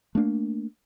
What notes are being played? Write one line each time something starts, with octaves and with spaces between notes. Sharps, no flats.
A3 A#3 D4